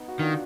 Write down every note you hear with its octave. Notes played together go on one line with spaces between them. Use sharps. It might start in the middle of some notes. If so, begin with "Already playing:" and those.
Already playing: B3 D#4
F#4
D#3 D4 F4